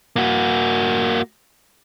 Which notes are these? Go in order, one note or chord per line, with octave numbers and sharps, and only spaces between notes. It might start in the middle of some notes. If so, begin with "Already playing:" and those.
A#3 F#4